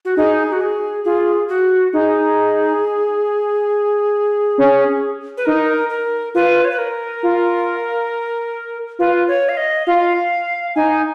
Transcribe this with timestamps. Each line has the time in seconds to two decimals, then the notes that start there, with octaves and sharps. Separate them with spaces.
0.05 F#4
0.17 D#4 G#4
0.52 F#4
0.61 G#4
1.04 F4 G#4
1.49 F#4
1.93 D#4 G#4
4.58 C#4
5.37 B4
5.45 D#4 A#4
5.90 A#4
6.35 F4 B4
6.65 C#5
6.71 B4
6.79 A#4
7.23 F4
8.99 F4 B4
9.28 C#5
9.49 F5
9.57 D#5
9.87 F4 F5
10.75 D#4 G#5